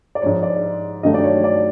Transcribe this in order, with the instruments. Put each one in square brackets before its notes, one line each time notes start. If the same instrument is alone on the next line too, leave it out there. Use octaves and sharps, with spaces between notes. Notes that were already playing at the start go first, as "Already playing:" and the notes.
[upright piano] D5
G#2 F3 G#3 C#5
D5
G2 D#3 F#3 A3 D#5
D5
C#5
D5